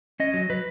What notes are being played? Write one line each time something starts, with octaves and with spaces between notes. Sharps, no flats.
C#4 D#5
F#3
F#3 B4